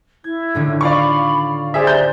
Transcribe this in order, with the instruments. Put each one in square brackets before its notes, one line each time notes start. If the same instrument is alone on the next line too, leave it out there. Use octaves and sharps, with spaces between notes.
[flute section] E4 [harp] G#6
[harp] A2 D3 D#3
[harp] F4 [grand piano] D5 F5 C#6 [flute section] B5
[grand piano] G4 G#4 E5 [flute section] C5 D5
[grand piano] A#5 G6